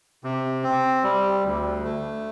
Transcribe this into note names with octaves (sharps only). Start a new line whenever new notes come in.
C3
C4
G3
D2
A3